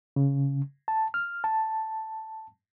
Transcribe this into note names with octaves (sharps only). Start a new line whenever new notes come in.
C#3
A5
F6
A5